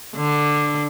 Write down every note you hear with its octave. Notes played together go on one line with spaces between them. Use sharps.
D3